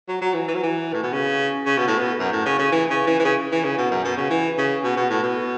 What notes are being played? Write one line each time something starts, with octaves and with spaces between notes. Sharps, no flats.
F#3
F#3
E3
E3
F#3
E3
A2
B2
C#3
C#3
B2
A2
B2
F#2
A2
C#3
C#3
E3
C#3
E3
E3
C#3
E3
C#3
B2
F#2
B2
C#3
E3
C#3
B2
B2
A2
B2